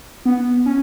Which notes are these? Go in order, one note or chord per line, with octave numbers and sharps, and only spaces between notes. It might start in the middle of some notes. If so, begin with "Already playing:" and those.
B3
C#4